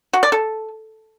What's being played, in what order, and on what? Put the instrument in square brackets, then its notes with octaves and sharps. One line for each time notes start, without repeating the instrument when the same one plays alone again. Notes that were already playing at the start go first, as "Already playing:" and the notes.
[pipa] F#4
D5
A4